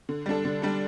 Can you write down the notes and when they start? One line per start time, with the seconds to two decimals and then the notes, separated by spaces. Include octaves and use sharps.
0.09 D3
0.26 G3 D4 A4
0.45 D3
0.62 G3 D4 A4